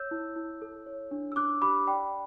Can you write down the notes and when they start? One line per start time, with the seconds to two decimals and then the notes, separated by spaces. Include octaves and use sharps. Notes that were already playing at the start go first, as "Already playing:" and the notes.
Already playing: C#5 E6 G6
0.11 E4
0.36 E4
0.62 A4
0.86 C#5
1.11 D4
1.32 E6
1.36 D4 D6 F#6
1.62 G4 B5 D6
1.87 D5 G5 B5